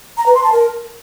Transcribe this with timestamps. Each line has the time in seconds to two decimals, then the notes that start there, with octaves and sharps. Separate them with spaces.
0.18 A#5
0.26 B4
0.35 C6
0.44 A5
0.52 A#4